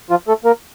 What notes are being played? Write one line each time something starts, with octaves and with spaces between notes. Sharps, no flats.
F3 F4
A3 A4
A#3 A#4